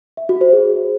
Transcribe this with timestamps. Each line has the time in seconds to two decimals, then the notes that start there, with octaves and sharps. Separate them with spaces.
0.17 E5
0.29 F#4
0.41 C5
0.53 G#4